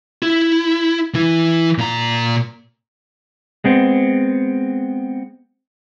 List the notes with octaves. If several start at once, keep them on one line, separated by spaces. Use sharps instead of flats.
E4
E3 E4
A#2 A#5
G#3 B3 C4